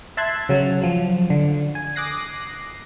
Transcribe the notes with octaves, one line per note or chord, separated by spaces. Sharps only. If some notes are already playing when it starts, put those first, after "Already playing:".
E5 A5 C6 F#6 G#6
C#3 F#3
F3 F#3
D3
G#5
D6 D#6 F#6 A#6 C7